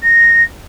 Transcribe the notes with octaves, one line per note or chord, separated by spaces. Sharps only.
A#6